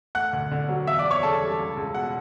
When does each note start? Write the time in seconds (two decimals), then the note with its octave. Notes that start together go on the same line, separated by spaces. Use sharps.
0.15 A3 F#5 F#6
0.33 D2
0.51 D3
0.69 F#3
0.87 E2 E5 E6
0.99 D5 D6
1.05 E2
1.11 C#5 C#6
1.23 C#3 A4 A5
1.42 G3
1.59 C#2
1.77 C#2
1.95 B2 F#5